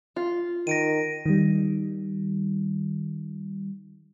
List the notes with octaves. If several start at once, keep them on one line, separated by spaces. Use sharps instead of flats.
F4
D#3 A#6 D7 D#7
D#3 G3